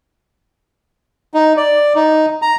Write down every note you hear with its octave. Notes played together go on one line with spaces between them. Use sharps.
D#4
D5
D#4
A#5